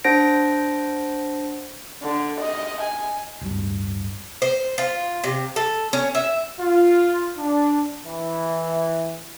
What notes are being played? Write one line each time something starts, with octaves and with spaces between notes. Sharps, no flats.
D4 C5 F#5 A#6 D7
D3
D#5
G#5
D1 G2
C5
F4
C3
A4
C#4
E5
F4
D4
E3